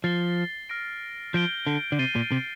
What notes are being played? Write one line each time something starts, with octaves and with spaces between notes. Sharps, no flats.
F3 A6 C7 G7
F6 A#6 D7
F3 G6 D7 G7
D3
D3
C3 A6 C7 D#7 G7
A#2
C3